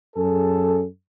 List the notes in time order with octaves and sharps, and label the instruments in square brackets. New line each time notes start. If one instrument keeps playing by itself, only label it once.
[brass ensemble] F#2 G#4 A4